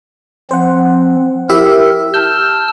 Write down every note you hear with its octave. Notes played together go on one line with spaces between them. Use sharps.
F3 C4 C5 F#5
E4 G4 A#4 E5
A5 E6 F6 G6